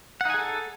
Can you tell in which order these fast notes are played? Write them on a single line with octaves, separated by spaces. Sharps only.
F#5 D#4 G#5 G#4 A4